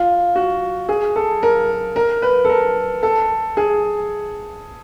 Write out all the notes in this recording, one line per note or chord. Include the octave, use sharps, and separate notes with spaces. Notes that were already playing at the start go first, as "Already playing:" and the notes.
Already playing: F4
F#4
G#4
A4
A#4
A#4
B4
A4
A#4
A4
G#4